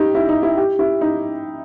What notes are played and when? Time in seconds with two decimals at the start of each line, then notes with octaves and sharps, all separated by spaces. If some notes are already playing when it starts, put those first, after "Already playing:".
Already playing: D#4 G4
0.15 E4
0.29 D#4
0.43 E4
0.57 G4
0.79 E4
1.01 D#4